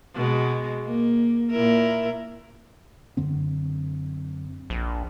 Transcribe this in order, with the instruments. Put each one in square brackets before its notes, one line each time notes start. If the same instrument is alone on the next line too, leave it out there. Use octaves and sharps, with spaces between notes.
[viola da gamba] B2 G#3
A#3
A#2 E4 A#4
[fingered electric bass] F#2 D3 C4
[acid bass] A#1